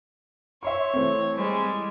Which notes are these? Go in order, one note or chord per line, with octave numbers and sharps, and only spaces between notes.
C#5 E5 C6 C#6
E3 A3 C4
G3 G#3